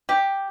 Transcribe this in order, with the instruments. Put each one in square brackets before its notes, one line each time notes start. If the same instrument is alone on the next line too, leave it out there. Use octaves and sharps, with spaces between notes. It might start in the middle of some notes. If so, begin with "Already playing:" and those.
[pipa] G4